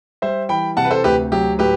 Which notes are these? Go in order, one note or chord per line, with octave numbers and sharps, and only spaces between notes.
G3 C5 E5
E3 G5 B5
C3 F#5 A5
B4
A4 C5
D2 G4 B4
F#3 G4
A2 G4 B4